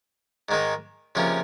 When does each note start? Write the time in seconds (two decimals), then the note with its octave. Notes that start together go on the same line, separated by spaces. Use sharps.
0.49 G#2 D#3 G#3 D#4
1.15 C#2 C3 F3 A#3 C#4